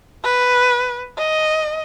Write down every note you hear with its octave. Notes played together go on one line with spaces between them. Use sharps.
B4
D#5